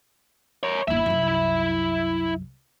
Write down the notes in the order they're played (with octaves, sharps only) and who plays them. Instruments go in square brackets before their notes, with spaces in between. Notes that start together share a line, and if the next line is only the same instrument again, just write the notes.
[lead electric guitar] A#4 C#5
[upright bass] G1 D#2 [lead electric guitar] E4 E5
[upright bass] C2 F#2